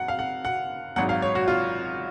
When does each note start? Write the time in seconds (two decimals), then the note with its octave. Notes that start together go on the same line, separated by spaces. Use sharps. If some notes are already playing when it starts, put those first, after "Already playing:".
Already playing: F#2 F#5
0.08 F5
0.19 F#5
0.45 F#5
0.96 G#1 G#2 F#3 F#5
1.09 F5
1.22 C#5
1.35 F#4
1.48 F4